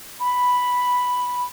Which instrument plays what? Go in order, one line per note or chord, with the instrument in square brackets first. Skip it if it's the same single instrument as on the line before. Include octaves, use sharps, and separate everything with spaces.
[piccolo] B5